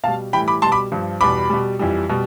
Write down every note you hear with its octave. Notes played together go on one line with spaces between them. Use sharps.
B2 G3 F5 A5
A2 E3 G3 G5 B5
B5 D6
B2 G3 A5 C6
B5 D6
G2 F3
E2 B2 G3 B5 D6
B2 G3
F2 E3 G3
B2 G3